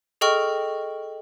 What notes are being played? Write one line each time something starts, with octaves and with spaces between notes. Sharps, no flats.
G#4 A4 D#5 G5 C#6 F6